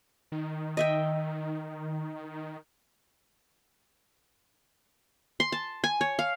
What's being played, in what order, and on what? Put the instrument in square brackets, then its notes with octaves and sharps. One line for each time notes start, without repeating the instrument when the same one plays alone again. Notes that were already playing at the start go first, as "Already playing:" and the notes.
[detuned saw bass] D#3
[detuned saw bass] D#3 [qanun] D#5 E5 G5
[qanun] C6
A5
G#5
C#5
F5